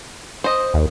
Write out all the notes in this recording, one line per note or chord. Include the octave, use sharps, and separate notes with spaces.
C5 D#5
D#2